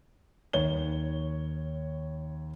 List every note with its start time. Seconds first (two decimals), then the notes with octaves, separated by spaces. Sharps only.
0.53 D#2 C#5 G7